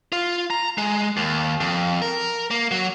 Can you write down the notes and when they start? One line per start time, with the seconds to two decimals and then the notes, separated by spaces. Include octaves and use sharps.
0.12 F4
0.50 A#5
0.78 G#3
1.17 D#2
1.60 F2
2.02 A#4
2.51 A#3
2.71 F#3